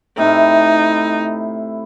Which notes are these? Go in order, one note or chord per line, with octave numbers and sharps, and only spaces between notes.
A2 C3 D#4 E4